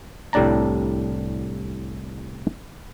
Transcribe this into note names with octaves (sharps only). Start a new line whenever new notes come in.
C2 A2 G3 D4 A5 A#5